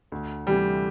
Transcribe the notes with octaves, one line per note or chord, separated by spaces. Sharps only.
D2
C3 E3 G3 A3